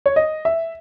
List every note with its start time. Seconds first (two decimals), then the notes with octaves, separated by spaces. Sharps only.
0.06 C#5
0.16 D#5
0.45 E5